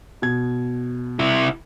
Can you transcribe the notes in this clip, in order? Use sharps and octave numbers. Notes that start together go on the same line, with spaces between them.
B2 G#6
C3 E4